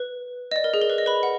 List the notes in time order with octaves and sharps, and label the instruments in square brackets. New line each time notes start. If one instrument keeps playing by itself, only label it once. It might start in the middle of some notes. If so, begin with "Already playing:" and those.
Already playing: [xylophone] B4
D#5
D5
A#4
G#4
A#4
B4
D#5
B4 B5
F#5